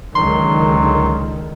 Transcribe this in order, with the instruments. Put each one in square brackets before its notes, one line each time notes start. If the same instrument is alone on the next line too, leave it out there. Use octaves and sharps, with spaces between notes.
[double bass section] C#2 D3 D#3 [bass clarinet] F#3 [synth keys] C6